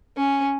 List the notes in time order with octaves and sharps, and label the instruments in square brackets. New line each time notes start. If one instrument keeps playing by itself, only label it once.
[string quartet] C#4